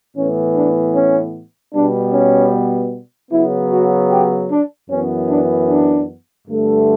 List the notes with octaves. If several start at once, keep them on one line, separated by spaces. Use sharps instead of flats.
A2 E3 B3 C#4
D4
C#4
B2 G3 B3 D4
C#4
C#3 F#3 B3 E4
F#4
G4
D4
F#2 E3 B3 C#4
D4
D4
G2 D3 A3